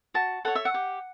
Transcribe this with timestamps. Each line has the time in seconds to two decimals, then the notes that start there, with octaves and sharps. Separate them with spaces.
0.14 F#4 A5
0.45 A4 C#5 F#5
0.55 E5
0.65 F#5
0.74 G4